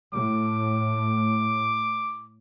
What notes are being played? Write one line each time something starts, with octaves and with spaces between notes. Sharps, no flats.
A2 D6